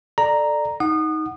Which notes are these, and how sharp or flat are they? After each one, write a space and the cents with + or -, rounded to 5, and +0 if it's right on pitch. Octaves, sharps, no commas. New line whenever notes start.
A4 +0 D5 +20 A#5 +0
D#4 +15 F#5 +0 D#6 -30